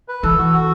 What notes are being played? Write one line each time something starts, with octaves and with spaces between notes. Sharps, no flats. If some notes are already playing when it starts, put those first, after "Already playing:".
B4
E3 A4
F#4
F#4